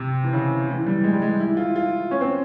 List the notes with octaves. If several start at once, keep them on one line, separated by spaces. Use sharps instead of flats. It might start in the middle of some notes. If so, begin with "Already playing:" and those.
Already playing: C3
E3
C#3
E3
G3
G#3
G3
G#3
E4
F4
F4
C#4
C4